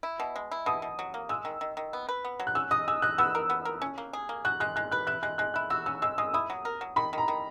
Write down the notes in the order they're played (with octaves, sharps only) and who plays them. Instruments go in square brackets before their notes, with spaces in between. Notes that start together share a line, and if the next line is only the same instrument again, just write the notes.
[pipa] E4
B2
G#3
E4
[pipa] B2 [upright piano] D#6
[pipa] B2
F#3
A#3
[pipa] G#3 [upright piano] E6
[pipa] D#3
D#3
D#3
B3
B4
B3
F#3
[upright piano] F#6
[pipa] C#4 [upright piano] E6
[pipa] D#5 [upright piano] D#6
[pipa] G#4 [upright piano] E6
[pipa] D#5 [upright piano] F#6
[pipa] B3 [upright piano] E6
[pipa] A#4
B3
A#4
C#4
A#3
G#4
A#3
[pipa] F#4 [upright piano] F#6
[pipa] G#3 [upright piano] F#6
[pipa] G#3 [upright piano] F#6
[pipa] B4 [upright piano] F#6
[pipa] E4 [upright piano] F#6
[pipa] G#3 [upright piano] F#6
[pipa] G#3 [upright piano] F#6
[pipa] E4 [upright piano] F#6
[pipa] F#4 [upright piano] E6
[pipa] C#4 [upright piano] E6
[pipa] G#3 [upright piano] E6
[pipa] G#3 [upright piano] D#6
[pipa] E4 [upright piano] D#6
[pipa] F#3
A#4
F#3
[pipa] D#3 [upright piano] B5
[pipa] D#3 [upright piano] A#5
[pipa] D#3